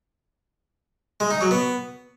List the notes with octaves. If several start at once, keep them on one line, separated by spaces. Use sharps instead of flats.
G#3
D#4
F#3
B3